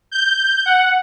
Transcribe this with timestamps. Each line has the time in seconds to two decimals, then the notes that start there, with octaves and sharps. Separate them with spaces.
0.11 G6
0.66 F#5